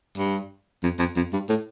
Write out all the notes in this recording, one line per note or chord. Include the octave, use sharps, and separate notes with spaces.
G2
F2
F2
F2
G2
A2